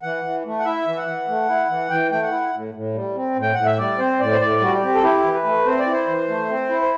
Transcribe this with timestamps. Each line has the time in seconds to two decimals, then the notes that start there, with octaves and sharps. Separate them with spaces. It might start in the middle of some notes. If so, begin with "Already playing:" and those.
0.03 E3 F#5
0.24 E3
0.45 A3
0.59 F#5
0.65 E4 E5
0.87 E3
0.97 F#5
1.07 E3
1.28 A3
1.49 E4
1.69 E3
1.90 E3 G5
2.11 A3 G5
2.22 F#5
2.32 E4
2.53 A2
2.74 A2
2.94 G3
3.15 C4
3.36 A2
3.42 G5
3.54 A2 F#5
3.66 E5
3.78 G3 D5
3.98 C4 C5
4.20 A2 D5
4.32 C5
4.41 A2 D5
4.61 G3 F#4
4.72 G4
4.83 C4
4.95 A4
5.03 E4 G4
5.24 E3
5.34 B4
5.44 A3
5.66 C4 C5
5.79 D5
5.87 E4
5.93 C5
6.07 E3
6.28 A3
6.49 C4
6.69 E4
6.81 C5